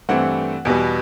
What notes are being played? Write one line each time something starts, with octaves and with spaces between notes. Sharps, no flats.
G2 E3 A3 C4 F#5
E2 B2 G3 B3